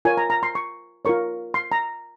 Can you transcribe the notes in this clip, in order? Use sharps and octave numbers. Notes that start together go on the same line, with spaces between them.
F4 A#4 C#5 G#5
A#5
A#5
C6
C#6
F4 A#4 C#5 C#6
C6
A#5